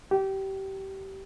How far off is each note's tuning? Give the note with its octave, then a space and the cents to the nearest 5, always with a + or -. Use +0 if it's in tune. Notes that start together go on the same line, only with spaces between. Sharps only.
G4 -25